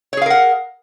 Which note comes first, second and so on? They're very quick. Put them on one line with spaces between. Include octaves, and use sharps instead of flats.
C#5 G#4 F5 A#4 F#5